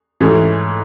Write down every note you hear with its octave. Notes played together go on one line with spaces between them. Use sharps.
G#2 E3 A3 C#4